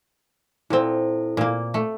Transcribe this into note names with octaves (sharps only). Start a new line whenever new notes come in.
A#2 C4 E4 A4
A#2 A#3
A3